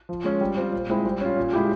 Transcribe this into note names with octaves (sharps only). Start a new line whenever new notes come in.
F3
G#3 C#4
G3
C4 F4
A#2
G#3 C4 E4
G3
C#4 F4
A#2
G#3 E4 G4